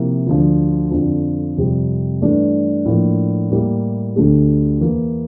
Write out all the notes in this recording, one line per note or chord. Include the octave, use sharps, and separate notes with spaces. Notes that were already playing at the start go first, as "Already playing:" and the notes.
Already playing: C3 F3 A#3 E4
D2 D3 F3
F2 D3 F3
F2 C3 G3
G2 E3 A3 D4
A2 F3 A#3 D4
A2 G3 A#3 E4 G4
D2 D3 A3 D4 G4
E2 E3 A#3